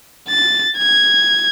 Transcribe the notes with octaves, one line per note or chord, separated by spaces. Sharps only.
A6
G#6